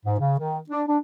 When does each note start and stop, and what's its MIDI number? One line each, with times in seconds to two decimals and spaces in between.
0.05 0.16 44
0.19 0.36 49
0.39 0.59 51
0.70 0.82 62
0.88 0.97 62